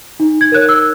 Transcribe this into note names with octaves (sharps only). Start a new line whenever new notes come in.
D#4
G#6
A#4 C#5 F#6
E6